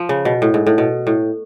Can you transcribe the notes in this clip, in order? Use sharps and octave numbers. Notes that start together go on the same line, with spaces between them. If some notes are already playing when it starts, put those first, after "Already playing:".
Already playing: F3
C#3
B2
A2
G#2
A2
B2
A2